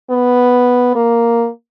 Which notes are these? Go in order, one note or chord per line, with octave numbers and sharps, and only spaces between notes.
B3
A#3